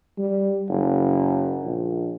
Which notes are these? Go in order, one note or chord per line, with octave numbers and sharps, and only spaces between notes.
G3
F#1
A#1